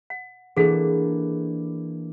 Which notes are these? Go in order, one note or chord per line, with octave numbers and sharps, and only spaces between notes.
F#5
E3 A#3 D4 G#4 A4 F#5